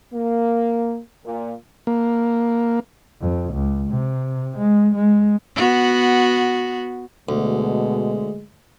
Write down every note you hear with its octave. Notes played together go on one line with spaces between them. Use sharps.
A#3
A#2
A#3
F2
C#2
C3
G#3
G#3
B3 F#4
D2 B2 G#3